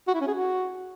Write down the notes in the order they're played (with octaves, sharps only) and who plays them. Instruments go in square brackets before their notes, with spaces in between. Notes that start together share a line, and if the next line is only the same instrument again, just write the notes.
[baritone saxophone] F#4
E4
C#4
G#4
F#4